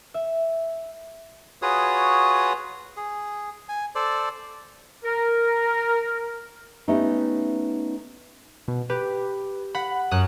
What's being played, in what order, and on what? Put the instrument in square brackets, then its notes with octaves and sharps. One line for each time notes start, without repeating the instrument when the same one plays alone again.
[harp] E5
[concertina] F4 F#4 G#4 B4 C#5 D#6
G#4
G#5
A4 C5 D5
[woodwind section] A#4
[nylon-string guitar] A3 B3 C#4 D#4 G4
[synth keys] B2
[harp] G4 [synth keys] B4
[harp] F#5 [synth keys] B5
[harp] F#2 [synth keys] D#6 F#6